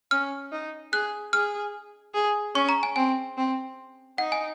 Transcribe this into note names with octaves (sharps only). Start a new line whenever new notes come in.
C#4 F6
D#4
G#4 F#6
G#4 F6
G#4
C#4 C#6
A#5
G#5
C4 G#5
C4
D#4 F#5
G#5